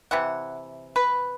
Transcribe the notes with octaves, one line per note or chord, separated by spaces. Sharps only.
C3 E3 F#5
B4